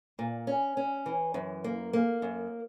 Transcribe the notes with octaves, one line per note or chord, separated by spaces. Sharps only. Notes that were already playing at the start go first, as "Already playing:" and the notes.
A#2
C#4
C#4
E3
F#2
A#3
A#3
F#2